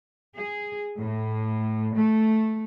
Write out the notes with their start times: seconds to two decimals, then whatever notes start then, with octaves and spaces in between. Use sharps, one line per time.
0.35 G#4
1.01 A2
1.96 A3